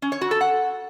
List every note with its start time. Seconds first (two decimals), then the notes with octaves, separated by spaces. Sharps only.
0.02 C#4
0.12 C#5
0.21 F#4
0.31 A4
0.41 F#5